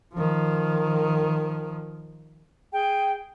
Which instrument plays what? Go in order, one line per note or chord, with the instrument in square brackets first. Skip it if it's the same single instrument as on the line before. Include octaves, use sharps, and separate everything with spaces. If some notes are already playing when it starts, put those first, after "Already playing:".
[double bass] D#3 F3
[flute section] G#4 G5